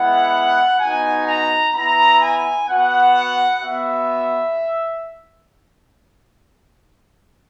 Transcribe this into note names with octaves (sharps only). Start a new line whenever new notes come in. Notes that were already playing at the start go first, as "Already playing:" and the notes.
Already playing: G#3 B3 E4 F#5
B3 D#4 F#4 G#5
A#5
B3 E4 A#5
G#5
B3 F#4 F#5
B3 F#4 E5